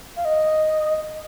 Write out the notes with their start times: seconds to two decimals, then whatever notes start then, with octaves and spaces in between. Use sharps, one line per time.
0.17 F5
0.25 D#5